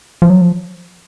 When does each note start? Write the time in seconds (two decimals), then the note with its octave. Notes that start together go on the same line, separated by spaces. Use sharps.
0.22 F3
0.30 F#3
0.41 F3